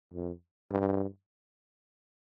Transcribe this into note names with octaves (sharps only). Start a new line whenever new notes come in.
F2
G2